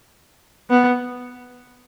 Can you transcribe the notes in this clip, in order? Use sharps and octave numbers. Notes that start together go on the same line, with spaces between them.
B3